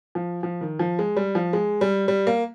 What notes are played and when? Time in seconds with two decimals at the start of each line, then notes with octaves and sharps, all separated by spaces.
0.15 F3
0.43 F3
0.61 D#3
0.79 F3
0.99 G#3
1.17 G3
1.35 F3
1.53 G#3
1.81 G3
2.08 G3
2.27 A#3